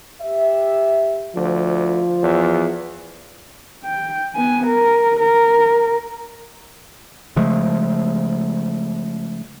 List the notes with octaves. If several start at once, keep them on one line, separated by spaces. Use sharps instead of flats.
G4 E5
D2 F3
E2
G5
B3 G#5
A#4
A#4
C#3 F3 G#3 A3